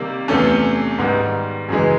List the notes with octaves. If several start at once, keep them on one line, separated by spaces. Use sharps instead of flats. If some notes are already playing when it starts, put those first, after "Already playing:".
Already playing: C3 D#3 G3 A#3
E2 C3 E3 A3 C#4
G#2 D#3 G3 B3
F#2 C#3 E3 G#3